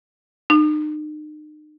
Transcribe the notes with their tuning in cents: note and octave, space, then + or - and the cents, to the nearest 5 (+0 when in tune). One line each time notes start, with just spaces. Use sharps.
D#4 -40